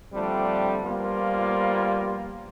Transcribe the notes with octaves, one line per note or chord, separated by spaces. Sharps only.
D3 F3 G3 A3 C4 D4
F3 G3 A#3 B3 F4